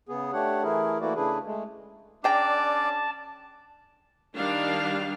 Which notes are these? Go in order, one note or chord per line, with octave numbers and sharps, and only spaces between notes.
C#3 B3 G#4
A3 D4 G4 C#5 F#5
E3 A3 E4 G#4 A#4
E3 A3 A#3 E4 F#4 D5
C#3 A3 D4 E4 G#4 B4
G#3 A3
C#4 D4 G#4 D5 G5 A5 A#5
D#3 G3 D4 F5